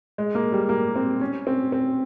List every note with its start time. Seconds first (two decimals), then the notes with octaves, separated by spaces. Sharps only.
0.18 G#3
0.35 A#3
0.52 G3
0.69 A#3
0.96 C4
1.21 C#4
1.47 C4
1.72 C4